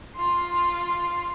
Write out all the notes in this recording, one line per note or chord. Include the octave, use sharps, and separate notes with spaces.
F4 C6